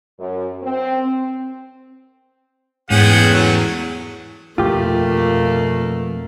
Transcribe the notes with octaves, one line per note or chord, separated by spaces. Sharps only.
F#2
C4
E2 G#2 A3 C#4 G#4 F#5 G5
F#3
F2 B2 A3 A#3 F4 G4